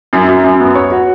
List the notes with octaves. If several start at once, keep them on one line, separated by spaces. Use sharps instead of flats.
F#2
F#2
F#2
B3
C#5
F#4